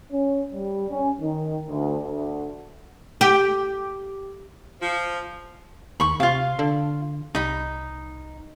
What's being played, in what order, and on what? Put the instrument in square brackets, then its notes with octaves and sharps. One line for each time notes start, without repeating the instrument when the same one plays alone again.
[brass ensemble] C#4
G3
C#4
D#3
D2
D2
[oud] G4
[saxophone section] F3
[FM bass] D#2 [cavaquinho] B5 C#6
[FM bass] C3 [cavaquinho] F4 F5
[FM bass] D3
[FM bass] C2 [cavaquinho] D#4 B5